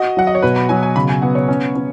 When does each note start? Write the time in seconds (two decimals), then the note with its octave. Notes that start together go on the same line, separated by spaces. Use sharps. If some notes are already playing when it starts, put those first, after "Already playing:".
Already playing: F#4 D#5
0.17 F#3 F#5
0.27 D#5
0.35 C#5
0.43 B2 B4
0.56 B5
0.69 F#3 G#5
0.83 G#5
0.96 C#3 B5
1.09 G#5
1.22 B3 F#5
1.35 C#5
1.48 C#4
1.75 C#4